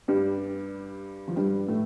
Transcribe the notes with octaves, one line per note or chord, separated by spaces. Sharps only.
G2 G3
F3
G2 G3
A2 A3